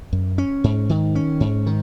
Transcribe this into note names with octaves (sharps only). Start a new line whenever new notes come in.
F#2
C#4
G#2
D#3
C#4
G#2
D#3